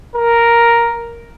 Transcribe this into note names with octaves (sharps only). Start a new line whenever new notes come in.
A#4